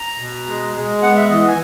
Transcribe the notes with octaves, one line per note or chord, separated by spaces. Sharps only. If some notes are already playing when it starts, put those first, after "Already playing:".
Already playing: A#5
B2
G#3
G#3
B3 F#5
E5
E3 D#5
G#5